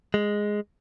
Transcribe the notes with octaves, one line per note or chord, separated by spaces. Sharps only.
G#3